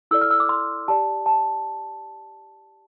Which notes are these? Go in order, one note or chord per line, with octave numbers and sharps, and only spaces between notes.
E4 A4 D5 E6
F6
E6
D6
C6
G4 D5 A5
A5